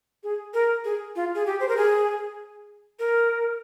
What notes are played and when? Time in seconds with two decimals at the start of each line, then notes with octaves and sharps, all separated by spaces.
0.23 G#4
0.54 A#4
0.85 G#4
1.16 F4
1.35 G#4
1.47 G4
1.60 C5
1.69 A#4
1.77 G#4
2.99 A#4